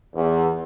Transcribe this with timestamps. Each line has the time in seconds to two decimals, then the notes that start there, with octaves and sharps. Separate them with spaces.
0.15 E2